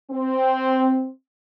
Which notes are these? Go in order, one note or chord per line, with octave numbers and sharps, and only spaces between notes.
C4